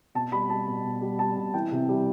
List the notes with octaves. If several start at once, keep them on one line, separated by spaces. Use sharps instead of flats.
B2 A5
G3 B5
G3 A5
B2
B2
G3
G3 A5
B2
E3 G5
C3
G3